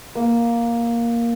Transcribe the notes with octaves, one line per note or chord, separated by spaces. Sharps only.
A#3